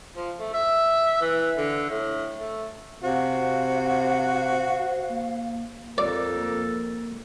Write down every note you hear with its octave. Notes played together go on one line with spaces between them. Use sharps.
F3
A3
E5
E3
D3
A2
A3
C3 F#4 C5 F5
A#3
F2 F3 A4 A#4 D5
A#3